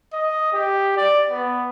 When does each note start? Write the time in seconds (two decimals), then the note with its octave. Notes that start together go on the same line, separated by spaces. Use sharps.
0.13 D#5
0.53 G4
0.97 D5
1.29 B3